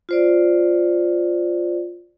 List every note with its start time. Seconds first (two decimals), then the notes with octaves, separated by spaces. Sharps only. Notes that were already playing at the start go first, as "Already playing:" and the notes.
0.09 F4 C5 D5